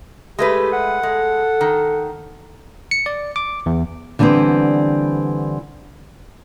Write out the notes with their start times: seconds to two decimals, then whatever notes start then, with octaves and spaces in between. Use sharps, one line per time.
0.39 G#3 A3 G4 B4
0.73 F#5
1.03 G#3 A4
1.61 D#3
2.91 C#7
3.06 D5
3.36 D6
3.66 E2
4.19 D3 E3 G3 B3 C4